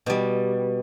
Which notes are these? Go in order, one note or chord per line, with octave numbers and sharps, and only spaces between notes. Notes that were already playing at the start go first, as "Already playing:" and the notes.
B2 G3